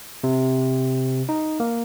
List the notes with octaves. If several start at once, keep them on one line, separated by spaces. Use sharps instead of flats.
C3
D#4
A#3